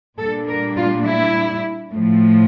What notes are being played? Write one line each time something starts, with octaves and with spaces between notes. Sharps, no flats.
A#2 G3 A#3 D4 A4
A#4
F4
E4
A2 F3 A3